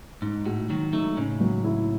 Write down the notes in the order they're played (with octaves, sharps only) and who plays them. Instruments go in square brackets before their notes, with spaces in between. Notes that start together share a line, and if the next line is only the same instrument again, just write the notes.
[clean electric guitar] G#2 [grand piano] D#4
[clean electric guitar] A2 [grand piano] F#4
[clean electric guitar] D#3 F#3 [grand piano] D#4
[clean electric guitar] F#3 A3 [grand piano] D#4
[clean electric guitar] A2 C#3 [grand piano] C#4
[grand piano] F#3
E4